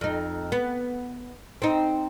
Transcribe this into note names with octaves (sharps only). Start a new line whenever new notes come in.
F2 D#4
B3
C4 D#4